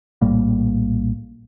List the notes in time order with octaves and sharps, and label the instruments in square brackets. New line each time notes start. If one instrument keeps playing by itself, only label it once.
[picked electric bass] A#1 A2 G3 A#3